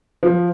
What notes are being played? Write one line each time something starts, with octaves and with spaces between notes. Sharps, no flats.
F3